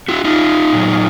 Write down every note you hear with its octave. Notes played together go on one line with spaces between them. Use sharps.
E4 F#4
D#4 F4
A#2 F#3